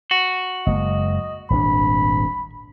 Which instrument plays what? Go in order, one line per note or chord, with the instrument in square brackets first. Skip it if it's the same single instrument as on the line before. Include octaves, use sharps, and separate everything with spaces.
[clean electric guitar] F#4
[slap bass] F#1 G#3 A#3 [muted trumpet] D#5
[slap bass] D#1 G#1 D4 [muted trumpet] B5